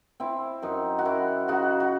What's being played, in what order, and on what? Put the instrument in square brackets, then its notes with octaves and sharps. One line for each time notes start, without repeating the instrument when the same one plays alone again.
[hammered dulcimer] C4 E4
F#2 D#4
F#4
F#2 E4
C#3 D#4 F#4
F#4